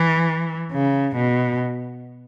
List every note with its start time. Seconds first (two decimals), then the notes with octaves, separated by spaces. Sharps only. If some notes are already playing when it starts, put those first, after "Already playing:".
Already playing: E3
0.72 C#3
1.17 B2